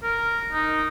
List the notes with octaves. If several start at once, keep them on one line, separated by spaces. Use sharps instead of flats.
A#4
D#4